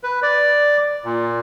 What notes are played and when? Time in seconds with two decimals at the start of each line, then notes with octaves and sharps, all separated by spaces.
0.03 B4
0.23 D5
1.04 A#2